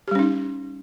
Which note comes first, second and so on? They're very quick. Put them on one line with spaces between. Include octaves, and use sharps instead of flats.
G4 G3 C#4 D#4